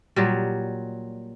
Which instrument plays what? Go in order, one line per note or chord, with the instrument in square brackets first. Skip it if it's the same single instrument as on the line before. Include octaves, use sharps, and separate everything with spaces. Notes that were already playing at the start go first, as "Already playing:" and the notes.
[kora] A#2 F#3 G3